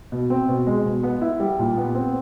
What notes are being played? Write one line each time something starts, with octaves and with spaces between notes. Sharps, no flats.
B2
C4
B2
G#3
B2
B3
E4
G3
A#2
B3
C4